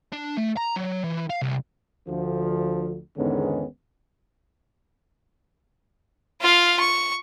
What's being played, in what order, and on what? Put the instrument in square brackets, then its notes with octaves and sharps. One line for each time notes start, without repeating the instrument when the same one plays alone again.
[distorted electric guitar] D4
A3
A#5
F#3
E3
F5
C2
[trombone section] D2 D3 F3
E2 G#2 D3 D#3 B3 C#4
[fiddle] F4 F5
C#6